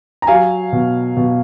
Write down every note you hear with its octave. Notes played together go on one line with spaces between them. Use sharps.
A#5
F#3 F5 G#5
B2
B2